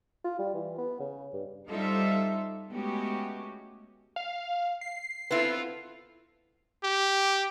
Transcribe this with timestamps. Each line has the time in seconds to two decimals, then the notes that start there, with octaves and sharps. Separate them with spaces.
0.24 F4
0.39 G3
0.54 E3
0.78 B3
1.00 C#3
1.33 G2
1.68 G3 D#4 F4 A4 C5 E5
2.72 G#3 A3 B3 C#4 F#4 G4
4.16 F5
4.81 C7
5.31 B3 C4 E4 F4 A4 B4
6.84 G4